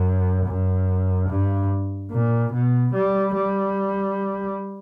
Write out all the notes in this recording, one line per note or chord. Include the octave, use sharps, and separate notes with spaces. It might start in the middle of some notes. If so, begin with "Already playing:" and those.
Already playing: F#2
F#2
G2
A#2
B2
G3
G3